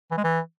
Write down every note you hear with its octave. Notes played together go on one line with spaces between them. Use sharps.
E3
G#3
E3